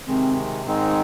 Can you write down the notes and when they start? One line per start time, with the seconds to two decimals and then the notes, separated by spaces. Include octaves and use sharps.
0.07 C3 D#3 G#3 C4
0.66 G#2 D#3 G#3 C4 D#4